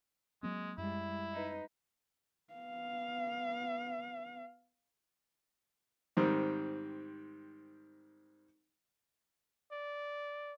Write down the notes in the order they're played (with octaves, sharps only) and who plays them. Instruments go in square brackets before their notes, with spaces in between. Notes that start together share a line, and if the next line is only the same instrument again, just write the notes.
[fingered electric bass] F#3 A#3 C4 [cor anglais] G#3
[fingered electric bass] F#2 [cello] G3 G#3 [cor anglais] E4
[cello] D#4 B4
[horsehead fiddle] B3 F5
[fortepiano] G#2 D#3 G3 C4
[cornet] D5